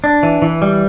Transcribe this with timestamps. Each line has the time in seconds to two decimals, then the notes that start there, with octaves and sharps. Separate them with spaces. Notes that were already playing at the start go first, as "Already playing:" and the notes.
0.04 D4
0.23 E3
0.42 E3
0.62 G3